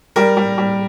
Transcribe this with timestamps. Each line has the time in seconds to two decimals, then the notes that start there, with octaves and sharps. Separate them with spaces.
0.16 G3 A#4
0.37 G3
0.58 G3